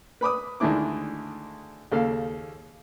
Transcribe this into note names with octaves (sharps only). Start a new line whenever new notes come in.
B4 B5 D6 D#6
D2 D#3 G#3 D4 E4 D6
D#2 C#3 A4 F5